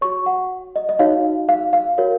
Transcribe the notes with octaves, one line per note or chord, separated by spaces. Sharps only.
F#4 C#5 C#6
F#5
D#5
D#5
D#4 F#4 C#5 F5
F5
F5
F#4 A#4 C#5